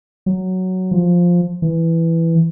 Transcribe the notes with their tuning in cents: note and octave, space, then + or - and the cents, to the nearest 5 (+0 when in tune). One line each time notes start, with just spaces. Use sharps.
F#3 +5
F3 +5
E3 +5